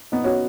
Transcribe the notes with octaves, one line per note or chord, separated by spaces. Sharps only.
B3 D#4
C#4 F#4